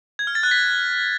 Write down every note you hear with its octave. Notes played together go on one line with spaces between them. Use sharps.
G#6
F6
A6
F#6
B6